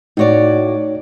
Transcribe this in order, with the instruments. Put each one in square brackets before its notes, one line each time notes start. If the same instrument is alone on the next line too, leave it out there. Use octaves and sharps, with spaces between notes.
[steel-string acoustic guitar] A2 F#4 D5 [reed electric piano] D#4 C#5